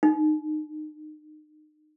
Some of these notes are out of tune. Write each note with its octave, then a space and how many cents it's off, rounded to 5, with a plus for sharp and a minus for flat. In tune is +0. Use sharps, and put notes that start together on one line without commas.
D#4 -35